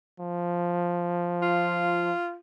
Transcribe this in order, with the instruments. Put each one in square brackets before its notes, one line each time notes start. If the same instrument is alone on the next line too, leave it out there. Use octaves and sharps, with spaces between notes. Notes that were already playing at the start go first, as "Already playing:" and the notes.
[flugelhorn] F3
[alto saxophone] F4